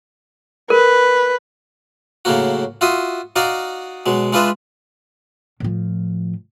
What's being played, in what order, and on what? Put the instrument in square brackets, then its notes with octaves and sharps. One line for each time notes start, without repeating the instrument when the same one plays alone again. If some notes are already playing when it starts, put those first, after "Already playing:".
[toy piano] A#4 [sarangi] B4
[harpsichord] A2 C#3 F#3 A#3 F#4
F4 F#4 E5 C6 D#6
D#4 F#4 D5 D#5 F5 D6
B2 F#3 G#3
G#3 D4 F4 B4 D#5 E5
[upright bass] A2 F3